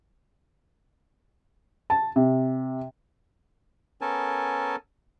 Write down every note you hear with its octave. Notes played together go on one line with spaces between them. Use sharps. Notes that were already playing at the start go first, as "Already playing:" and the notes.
A5
C3
B3 C#4 A4 A#4 G#5 A5